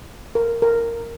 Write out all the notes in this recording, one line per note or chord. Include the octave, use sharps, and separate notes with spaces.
A#4
A#4